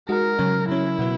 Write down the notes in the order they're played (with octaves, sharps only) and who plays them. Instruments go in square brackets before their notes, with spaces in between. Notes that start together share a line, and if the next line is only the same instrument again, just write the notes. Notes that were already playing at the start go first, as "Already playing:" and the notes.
[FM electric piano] G#3 D#4 F#4 [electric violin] A#4
[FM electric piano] C#3 F#3 C#4
[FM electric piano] C#3 F#3 C#4 [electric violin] E4
[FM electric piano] B2 F#3 B3